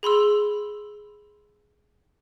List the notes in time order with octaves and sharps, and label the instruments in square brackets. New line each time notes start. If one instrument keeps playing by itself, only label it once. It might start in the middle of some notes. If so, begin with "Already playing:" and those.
[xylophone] G#4 B5 C6 E6